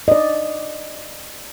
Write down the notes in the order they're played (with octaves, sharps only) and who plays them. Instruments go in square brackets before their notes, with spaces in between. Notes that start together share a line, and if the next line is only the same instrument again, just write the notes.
[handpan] D5 D#5